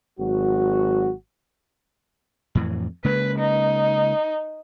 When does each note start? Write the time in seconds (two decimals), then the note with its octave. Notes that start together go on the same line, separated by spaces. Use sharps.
0.19 G#1 F#3 F#4
2.55 F2 A2 E3
3.05 C#3 G#3 A#3 B4
3.39 D#4